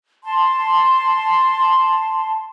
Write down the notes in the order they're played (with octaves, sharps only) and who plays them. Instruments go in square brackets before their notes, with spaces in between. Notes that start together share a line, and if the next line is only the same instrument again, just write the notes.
[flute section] A5 C6